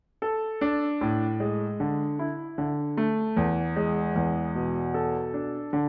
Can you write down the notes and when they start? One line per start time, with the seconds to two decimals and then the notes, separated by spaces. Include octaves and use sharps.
0.22 A4
0.61 D4
1.01 A2
1.40 G#3
1.80 D3
2.19 E4
2.58 D3
2.97 A3
3.37 E2
3.76 G#3
4.16 E2
4.55 B2
4.94 A4
5.34 D4
5.73 D3